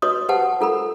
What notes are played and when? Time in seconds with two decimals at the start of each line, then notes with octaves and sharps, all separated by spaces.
0.02 F#4 B4 C#5 D#5 C6 D#6
0.29 G4 B4 C5 F#5 A5
0.61 F4 A4 A#4 B5